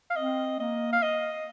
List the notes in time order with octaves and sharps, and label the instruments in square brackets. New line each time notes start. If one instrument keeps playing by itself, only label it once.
[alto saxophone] F5
[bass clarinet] C4 [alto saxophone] D#5
[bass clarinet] A#3 [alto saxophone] D#5
[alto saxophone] F5
D#5